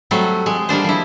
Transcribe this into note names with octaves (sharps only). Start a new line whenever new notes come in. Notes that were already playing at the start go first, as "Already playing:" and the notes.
F#3 G3 A3 C4
G#3
G3 A#3 D4 C5
F3 E4